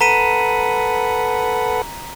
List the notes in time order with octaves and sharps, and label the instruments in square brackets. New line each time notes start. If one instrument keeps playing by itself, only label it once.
[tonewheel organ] A4 B4 F#5 [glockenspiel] A#5 B6 D#7